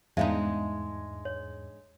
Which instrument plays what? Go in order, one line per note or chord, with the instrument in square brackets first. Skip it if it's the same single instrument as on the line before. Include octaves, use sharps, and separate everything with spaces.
[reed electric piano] E2 G#2 [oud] G#3 D4 D#4 [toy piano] E5 F5
[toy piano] C#5